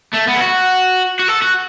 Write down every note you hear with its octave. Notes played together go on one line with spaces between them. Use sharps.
A3
B3
E4
F#4
F#4
A4
F#4